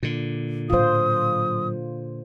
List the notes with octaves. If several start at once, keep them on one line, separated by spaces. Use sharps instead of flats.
A#2 D3
A2 F#3 F4 C5 D#6